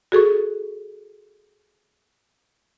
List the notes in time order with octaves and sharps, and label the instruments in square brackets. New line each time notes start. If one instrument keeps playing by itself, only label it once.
[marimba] F#4 G#4 A4 C#6